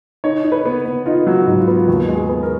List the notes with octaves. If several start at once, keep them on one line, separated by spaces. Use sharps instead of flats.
D#4 C#5
D#4
B4
B3
B3
D#4 F4
F#3
F#4
G#2
F4
B3
F4
D#2 F#4
G#3
G#4
B3
A#4